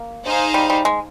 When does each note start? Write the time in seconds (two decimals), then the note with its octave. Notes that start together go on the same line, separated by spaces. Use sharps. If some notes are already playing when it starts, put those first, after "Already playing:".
Already playing: A#3
0.24 D#4 G#4 C5 F5
0.54 G3
0.70 G3
0.85 G#3